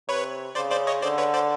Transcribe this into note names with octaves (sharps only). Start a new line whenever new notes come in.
C3 B4 C#5
C#3 C5 D5
C5 D5
C#5 D#5
D3 C5 D5
B4 C#5
C5 D5